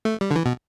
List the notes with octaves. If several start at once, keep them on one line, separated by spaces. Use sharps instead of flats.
A3
G3
D3
E3
B2